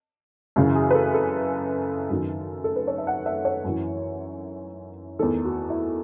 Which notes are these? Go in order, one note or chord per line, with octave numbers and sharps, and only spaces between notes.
F#2 C#3 E3 F#4
G#4
B4
A4
A4
F#2 D#3
A4
B4
C#5
E5
F#5
E5
C#5
F#2 E3
E2 D#3 A4
F#4
E4